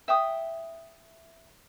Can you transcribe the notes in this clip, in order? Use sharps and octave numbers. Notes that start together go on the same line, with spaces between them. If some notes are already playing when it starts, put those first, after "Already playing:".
E5 G5 D#6